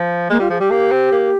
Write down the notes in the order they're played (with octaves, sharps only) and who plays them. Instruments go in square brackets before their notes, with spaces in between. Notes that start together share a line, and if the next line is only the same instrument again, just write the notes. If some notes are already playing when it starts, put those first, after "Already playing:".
Already playing: [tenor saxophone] F3
[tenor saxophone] G#3 [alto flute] A#3
[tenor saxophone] G3 [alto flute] F4
[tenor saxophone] F3 [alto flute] G#4
[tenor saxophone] G3 [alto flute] G4
[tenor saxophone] A#3
C4
A#3